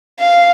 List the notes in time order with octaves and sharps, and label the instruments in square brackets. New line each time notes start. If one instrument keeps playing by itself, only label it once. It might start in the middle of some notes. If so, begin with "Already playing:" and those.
[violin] F5